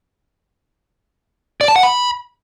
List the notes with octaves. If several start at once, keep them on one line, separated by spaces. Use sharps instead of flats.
D5
A5
F#5
B5